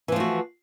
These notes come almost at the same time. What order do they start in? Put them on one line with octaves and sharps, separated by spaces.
E3 F3 A3 F#4